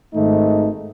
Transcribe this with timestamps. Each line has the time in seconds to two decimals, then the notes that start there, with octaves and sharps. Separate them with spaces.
0.13 G#1 G#2 D#3 A3 D#4